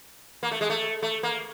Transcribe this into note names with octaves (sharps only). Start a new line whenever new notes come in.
A#3
A3
G#3
A3
A3
A#3